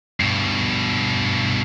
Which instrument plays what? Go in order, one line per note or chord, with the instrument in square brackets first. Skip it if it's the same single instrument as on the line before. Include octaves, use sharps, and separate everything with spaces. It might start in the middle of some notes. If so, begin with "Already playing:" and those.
[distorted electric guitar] G2 B2